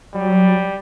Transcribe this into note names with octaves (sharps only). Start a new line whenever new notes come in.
F#3 G3